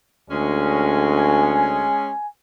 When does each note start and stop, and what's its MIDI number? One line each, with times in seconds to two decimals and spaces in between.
0.30 1.88 38
0.30 2.10 56
0.30 2.10 61
1.14 2.26 80